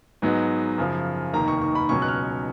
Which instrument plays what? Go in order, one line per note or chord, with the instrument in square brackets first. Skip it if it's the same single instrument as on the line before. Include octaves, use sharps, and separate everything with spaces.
[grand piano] G#2 F#3 B3 D#4
F#2 C#3 F3
F1 D#2 D#3 A#3 A#5
C#6
C#6
B5
C#2 B2 F#3 C#4 C#6
F#6
F6